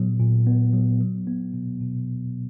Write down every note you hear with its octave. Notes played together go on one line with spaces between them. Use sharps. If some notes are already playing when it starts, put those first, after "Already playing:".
Already playing: A#2 F#3 B3
A#2
B3
F#3
F#3
B3
B2
B2